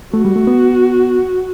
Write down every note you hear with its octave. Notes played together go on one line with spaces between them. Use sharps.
A3 F#4
G3
A3
B3